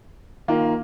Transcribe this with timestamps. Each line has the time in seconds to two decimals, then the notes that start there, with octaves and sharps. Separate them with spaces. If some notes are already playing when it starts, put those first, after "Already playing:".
0.48 D#3 A#3 F4